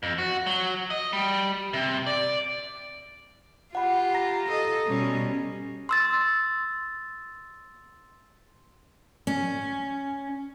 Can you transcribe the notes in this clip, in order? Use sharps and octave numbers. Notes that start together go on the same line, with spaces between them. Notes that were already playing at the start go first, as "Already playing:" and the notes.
F2
F#4
F#3
D#5
G3
C3
D5
F4 G4 F#5 B5
A#5 A#6
A4 D#5
B2 G3 C#4
C6 E6 A6
C#4